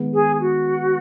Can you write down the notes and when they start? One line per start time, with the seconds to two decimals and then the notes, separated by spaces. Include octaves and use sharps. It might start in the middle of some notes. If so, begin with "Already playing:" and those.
Already playing: D#3 G#3 B3
0.13 G#4
0.40 F#4